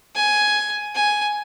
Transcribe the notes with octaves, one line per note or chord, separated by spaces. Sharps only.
G#5
G#5